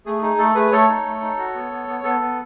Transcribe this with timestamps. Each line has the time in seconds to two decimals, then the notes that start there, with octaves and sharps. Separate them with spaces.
0.06 A3 G#4
0.22 D#4 G#4
0.38 A3 A4
0.55 A3 G#4 B4
0.72 A3 A4 C#5
0.88 D#4
1.05 A3
1.21 D#4
1.38 F#4
1.54 B3
1.72 B3
1.88 B3
2.03 B3 A4
2.20 B3